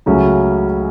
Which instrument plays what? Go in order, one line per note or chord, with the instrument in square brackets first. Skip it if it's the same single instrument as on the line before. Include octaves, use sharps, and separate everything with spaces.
[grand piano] C#2 C#3 F#3 A3 C#4